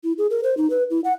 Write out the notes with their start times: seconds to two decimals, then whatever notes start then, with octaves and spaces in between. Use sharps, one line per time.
0.04 E4
0.18 G#4
0.30 A#4
0.43 C5
0.57 D#4
0.70 B4
0.90 E4
1.04 F#5